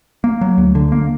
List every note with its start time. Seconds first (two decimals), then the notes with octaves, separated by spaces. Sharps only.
0.24 A#3
0.41 F#3
0.58 D2
0.75 D3
0.92 A#3